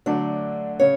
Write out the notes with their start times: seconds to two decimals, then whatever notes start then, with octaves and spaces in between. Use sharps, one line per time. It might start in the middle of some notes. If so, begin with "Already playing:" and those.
0.06 D3 F#3 A3 D4 D5
0.79 C#3 C#5